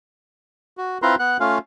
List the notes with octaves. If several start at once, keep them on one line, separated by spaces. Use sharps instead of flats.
F#4
C4 E4 F4 B4 A#5 C6
B3 F#5 F#6
A3 C#4 F4 F5